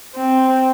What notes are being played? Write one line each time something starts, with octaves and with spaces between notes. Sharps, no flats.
C4